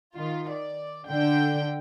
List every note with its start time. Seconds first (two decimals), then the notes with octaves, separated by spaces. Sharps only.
0.16 D#3 F4
0.53 D5
1.07 D3 G5